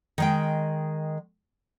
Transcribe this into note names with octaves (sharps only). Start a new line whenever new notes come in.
D#3 G#3 G5